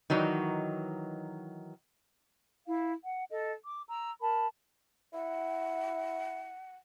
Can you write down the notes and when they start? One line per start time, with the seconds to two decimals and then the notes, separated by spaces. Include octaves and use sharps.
0.10 D#3 E3 F#3 D#4
2.67 E4 F5
3.04 F#5
3.30 A4 D#5
3.65 D6
3.88 A#5 E6
4.21 A#4 A5 B5
5.14 E4 F#5